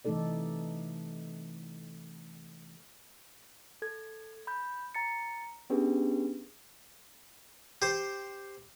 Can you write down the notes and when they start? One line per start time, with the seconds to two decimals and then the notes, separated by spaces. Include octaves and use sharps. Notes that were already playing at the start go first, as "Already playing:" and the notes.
0.05 C3 E3 A3 D#4 A4 D5
3.82 A4 G#6
4.47 B5 G6
4.95 A#5 A6 C#7
5.70 B3 C#4 D4 G4 G#4 B4
7.82 G4 C5